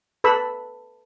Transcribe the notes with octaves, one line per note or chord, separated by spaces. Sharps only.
A4 B4 B5 E6